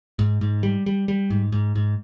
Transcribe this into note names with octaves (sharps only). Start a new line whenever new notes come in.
G#2
G#2
G3
G3
G3
G#2
G#2
G#2